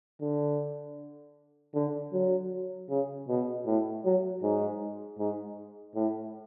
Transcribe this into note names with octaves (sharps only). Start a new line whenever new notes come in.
D3
D3
F#3
C#3
B2
A2
F#3
G#2
G#2
A2